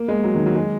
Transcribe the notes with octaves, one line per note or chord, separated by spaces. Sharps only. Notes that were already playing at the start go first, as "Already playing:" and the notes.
Already playing: A#3
G#3
F#3
D#3
F#3
G#3